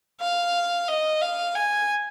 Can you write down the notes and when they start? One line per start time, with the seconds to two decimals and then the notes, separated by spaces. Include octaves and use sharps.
0.20 F5
0.88 D#5
1.21 F5
1.55 G#5